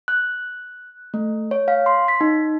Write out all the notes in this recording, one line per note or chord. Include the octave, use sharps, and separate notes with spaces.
F#6
A3
C#5
F5
C6
B6
D#4